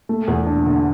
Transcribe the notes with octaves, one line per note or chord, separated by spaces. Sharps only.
A3
E2
D4
D3